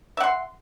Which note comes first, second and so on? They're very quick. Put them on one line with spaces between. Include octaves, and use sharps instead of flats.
E5 F#5 C6